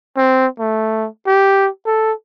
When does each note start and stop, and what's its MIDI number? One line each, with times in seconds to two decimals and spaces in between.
0.17 0.46 60
0.60 1.08 57
1.27 1.69 67
1.87 2.13 69